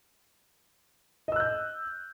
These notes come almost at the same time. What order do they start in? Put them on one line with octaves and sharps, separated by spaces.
D#5 E6 F#6 G6